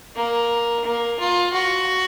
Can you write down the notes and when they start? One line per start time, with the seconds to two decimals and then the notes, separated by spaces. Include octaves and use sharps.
0.16 A#3
0.85 A#3
1.19 F4
1.53 F#4